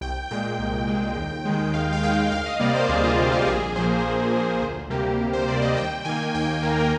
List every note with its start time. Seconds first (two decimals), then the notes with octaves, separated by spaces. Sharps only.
0.01 C2 G5
0.31 A#2 G#3 G5
0.59 C2
0.88 A#2 G#3
1.17 D#2
1.45 D#3 G#3
1.74 D#2 F5
1.93 F5
2.03 D#3 G#3 G5
2.31 D2 F5
2.46 D#5
2.60 C3 G3 A#3 D5
2.75 C5
2.89 D2 G#4
3.04 F4
3.17 C3 G3 A#3 F4
3.32 G4
3.47 A#1 G#4
3.75 A#2 F3 A#3 C5
4.04 A#1
4.33 A#2 F3 A#3
4.62 D2
4.90 C3 G3 A#3 G4
5.20 D2
5.33 C5
5.48 C3 G3 A#3 D5
5.62 D#5
5.76 D#2 G5
6.05 D#3 A#3 G#5
6.34 D#2 G5
6.62 D#3 A#3 A#4
6.80 A#4